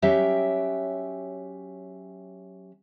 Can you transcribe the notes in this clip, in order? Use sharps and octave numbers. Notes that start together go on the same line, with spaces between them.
F#3 C#4 G4 E5 G5